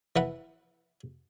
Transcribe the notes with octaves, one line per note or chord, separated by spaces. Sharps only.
E3 B4 F#5